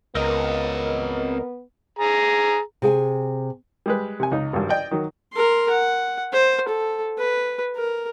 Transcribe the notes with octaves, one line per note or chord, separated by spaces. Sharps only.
C#2 B3 C4 A#4 D#5
G#4 A#5
C3 G#4 G5 G#5
G3 G#3 B4
C3 G#5
C#2 D#4
G#1 G2
D5 D#5 G5
D#3 F#3
A#4 C6
F#5
C5
A4
B4
A#4